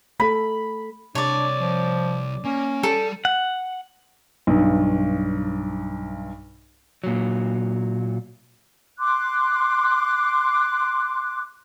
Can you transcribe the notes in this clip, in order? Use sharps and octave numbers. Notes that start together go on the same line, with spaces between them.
A3 A4 B5
C2 D4 C#5 D5
F3
A#3 C#4
G3 A4 D5
F#5
B1 G2
A#2 F#3
C6 D6 F#6